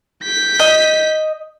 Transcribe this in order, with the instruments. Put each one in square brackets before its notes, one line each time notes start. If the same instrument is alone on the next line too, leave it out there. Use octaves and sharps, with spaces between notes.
[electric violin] G6 B6
[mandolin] D#5